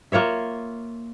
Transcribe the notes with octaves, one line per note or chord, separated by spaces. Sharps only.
A#3 F4 C#5 E5